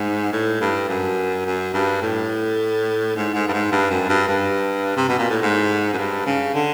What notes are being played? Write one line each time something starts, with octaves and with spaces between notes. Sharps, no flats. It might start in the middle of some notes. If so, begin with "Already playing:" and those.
Already playing: G#2
A2
G2
F#2
F#2
G2
A2
G#2
G#2
G2
G#2
G2
F#2
G2
G2
C3
B2
A#2
A2
G#2
F#2
G2
C#3
D3